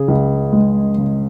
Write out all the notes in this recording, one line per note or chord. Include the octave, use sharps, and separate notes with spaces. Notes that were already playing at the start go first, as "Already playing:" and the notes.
Already playing: C#3 G#4
C#2
G#3
C#3